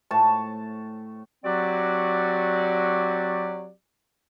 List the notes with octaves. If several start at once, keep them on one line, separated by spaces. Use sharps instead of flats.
A2 A5 C#6
F#3 C4 F#4 G4 D5